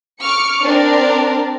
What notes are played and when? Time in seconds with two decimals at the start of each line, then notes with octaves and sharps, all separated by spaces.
0.21 C#6 D6 F6 C#7
0.63 C4 D4 A#4